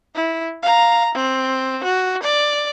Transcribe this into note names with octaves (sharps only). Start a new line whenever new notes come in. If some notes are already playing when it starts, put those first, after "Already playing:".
E4
F5 A#5
C4
F#4
D5